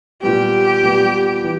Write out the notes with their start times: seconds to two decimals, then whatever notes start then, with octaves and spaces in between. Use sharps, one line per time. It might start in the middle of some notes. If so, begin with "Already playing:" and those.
0.22 A#2 G3 B3 G4
0.83 A#2 G3 B3
1.43 E3